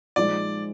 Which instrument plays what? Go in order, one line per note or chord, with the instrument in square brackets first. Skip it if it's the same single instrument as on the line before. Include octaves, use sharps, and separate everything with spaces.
[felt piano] A#2 F3 G#3 D#4 [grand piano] D5